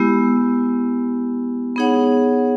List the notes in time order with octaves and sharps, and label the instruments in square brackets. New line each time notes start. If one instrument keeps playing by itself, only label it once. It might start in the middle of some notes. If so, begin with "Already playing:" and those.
Already playing: [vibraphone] G#3 B3 E4 G4
B3 D#4 G#4 C#5 F#5